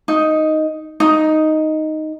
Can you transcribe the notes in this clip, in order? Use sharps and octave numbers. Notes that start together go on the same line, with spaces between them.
D#4
D#4